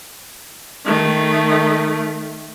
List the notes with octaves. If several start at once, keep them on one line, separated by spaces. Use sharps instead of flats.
D#3 A3